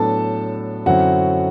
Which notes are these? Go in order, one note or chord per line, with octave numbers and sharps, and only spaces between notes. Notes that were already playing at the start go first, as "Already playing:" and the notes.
Already playing: A2 F#3 B3 D4 A4 A5
F#2 D3 F#3 C4 E4 F#4 F#5